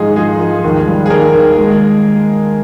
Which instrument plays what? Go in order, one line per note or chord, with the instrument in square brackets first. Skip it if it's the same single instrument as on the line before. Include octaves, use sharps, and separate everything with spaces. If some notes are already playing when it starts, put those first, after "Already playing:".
Already playing: [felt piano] G#2 F3 [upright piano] D#3 G#3 D#4 G#4
[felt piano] F3 [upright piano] G#3 G#4
[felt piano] F3
D#2
G3
[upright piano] G#4
[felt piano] D#3 [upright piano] A#3 A#4
[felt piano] D#2
G#3